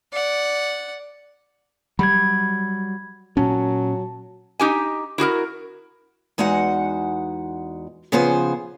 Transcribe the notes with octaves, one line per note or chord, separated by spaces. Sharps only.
D5 F#5
F#3 G3 B5 G#6
A#2 F#3 C#4 A5
D#4 G4 G#5
E4 F#4 G#4 A#4
E2 G#3 D#4 F#4 F#5
C#3 F3 B3 G#4 C5